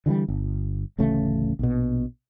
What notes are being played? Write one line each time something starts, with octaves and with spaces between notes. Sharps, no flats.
D3 E3 F3 G3
G1
D1 A1 C#3 A3
A#1 B2